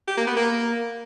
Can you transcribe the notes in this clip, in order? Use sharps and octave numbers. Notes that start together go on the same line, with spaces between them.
G4
A#3
B3
A#3